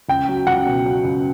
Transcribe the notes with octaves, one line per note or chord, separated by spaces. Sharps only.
C#2 G5
F#3
C#2 F#5
B2
F#3
C#2